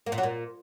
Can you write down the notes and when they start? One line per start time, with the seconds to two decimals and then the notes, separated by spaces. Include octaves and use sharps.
0.06 A#3
0.12 A#2
0.18 F#3
0.23 A#2